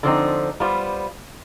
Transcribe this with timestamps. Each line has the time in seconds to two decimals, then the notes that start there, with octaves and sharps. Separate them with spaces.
0.03 D3 F3 C4 D#4
0.60 G3 B3 F4 C5